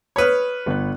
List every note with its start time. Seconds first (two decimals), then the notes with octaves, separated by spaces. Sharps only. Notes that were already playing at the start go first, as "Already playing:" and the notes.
0.16 B4 C#5 B5 D#6 F6
0.66 G1 F#6